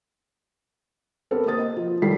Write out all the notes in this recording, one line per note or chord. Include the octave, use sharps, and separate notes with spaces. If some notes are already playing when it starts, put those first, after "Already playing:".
B3 C4 G4 A4 A#4
A#3 C5 D#6 A6
D#5
F3
D#2 E3 G3 A4 B6 C7